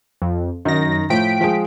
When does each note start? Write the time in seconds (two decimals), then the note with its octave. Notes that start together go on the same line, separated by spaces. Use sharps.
0.22 F2
0.65 F#2 D#3 D#4 A#6
1.10 A2 F3 G5 B6 D7
1.41 F3 G#3